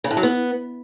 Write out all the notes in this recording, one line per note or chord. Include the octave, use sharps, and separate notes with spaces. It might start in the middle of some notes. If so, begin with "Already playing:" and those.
C#3
A2
F#3
B3